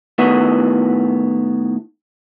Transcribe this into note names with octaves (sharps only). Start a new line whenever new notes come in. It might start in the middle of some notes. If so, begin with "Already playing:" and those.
A2 D#3 B3 E4 F#4